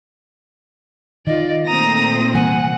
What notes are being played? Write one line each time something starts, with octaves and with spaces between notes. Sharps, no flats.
D#3 F4 D5 D#5
A#2 A3 C4 A#5 D#6 A#6
C3 E3 G3 F#5 G#5